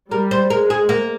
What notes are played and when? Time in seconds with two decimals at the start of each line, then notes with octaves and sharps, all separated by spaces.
0.11 G3 A#4
0.31 C5
0.50 G#3 A#4
0.70 G#4
0.89 A#3